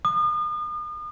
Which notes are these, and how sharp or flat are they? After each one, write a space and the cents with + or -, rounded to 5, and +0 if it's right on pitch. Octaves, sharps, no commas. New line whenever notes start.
D#6 -40